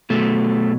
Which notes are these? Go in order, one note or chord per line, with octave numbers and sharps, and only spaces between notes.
B2 F#3 A3